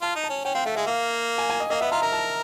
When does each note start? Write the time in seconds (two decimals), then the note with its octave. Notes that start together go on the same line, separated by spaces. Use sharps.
0.02 F4 A5
0.16 D#4
0.24 A5
0.30 C#4
0.45 C#4 G5
0.55 C4 F5
0.66 A3 E5
0.76 G#3 E5
0.86 A#3 F5
1.38 G#5
1.50 G#5
1.60 D#5
1.70 A#3 D#5
1.81 B3 E5
1.92 F4 A#5
2.02 A#4 A#5
2.12 A5